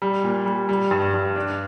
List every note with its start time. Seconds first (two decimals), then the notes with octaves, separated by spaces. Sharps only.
0.02 G3
0.24 A#2
0.46 G3
0.69 G3
0.91 G2
1.14 G2
1.36 D4